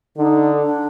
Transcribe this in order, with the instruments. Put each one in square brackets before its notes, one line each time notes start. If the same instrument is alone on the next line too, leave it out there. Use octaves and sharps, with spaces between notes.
[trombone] D3 [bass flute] D#4
[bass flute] D4